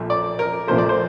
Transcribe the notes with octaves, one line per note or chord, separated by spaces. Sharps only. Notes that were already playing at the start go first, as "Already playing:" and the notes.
Already playing: A#1 A#2 F3 A3
D5
A#4
A#1 A#2 F3 A3 C5
D5
C5